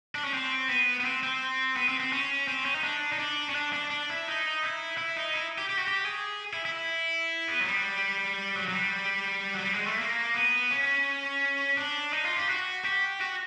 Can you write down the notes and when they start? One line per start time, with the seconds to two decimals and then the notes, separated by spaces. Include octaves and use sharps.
0.15 D4
0.24 C#4
0.34 C4
0.69 B3
1.00 B3
1.05 C4
1.23 C4
1.76 B3
1.88 C4
2.00 C4
2.12 C#4
2.48 C4
2.65 C#4
2.75 D#4
2.84 D4
3.12 D#4
3.19 D4
3.49 C#4
3.55 D4
3.73 D4
3.90 D4
4.09 E4
4.27 D#4
4.63 E4
4.98 E4
5.16 D#4
5.34 E4
5.58 G4
5.69 G4
5.78 F#4
5.88 G4
6.05 G#4
6.53 E4
6.65 E4
7.48 B3
7.60 F#3
7.66 G3
8.56 F#3
8.68 F#3
8.74 G3
9.54 F#3
9.63 G3
9.74 G#3
9.87 A3
9.99 A#3
10.34 B3
10.71 C#4
11.77 D4
12.13 D#4
12.25 F4
12.37 G4
12.49 F#4
12.85 G4
13.21 F#4